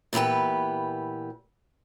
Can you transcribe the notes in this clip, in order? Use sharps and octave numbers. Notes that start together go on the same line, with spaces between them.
A#2 E3 B3 G4 B4